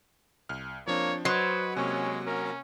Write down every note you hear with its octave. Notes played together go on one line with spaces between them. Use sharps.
C2 F6
F3 A#3 C4 D4 C#5
F#3 B4 C5 D#5 C6 D#6
C3 G#3 A#3 C#4 C#6
C#4 A#4